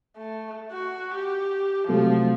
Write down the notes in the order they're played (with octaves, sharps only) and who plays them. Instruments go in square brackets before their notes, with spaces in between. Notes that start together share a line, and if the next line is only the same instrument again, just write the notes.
[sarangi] A3
F#4
G4
[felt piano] C3 F#3 A3 [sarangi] F3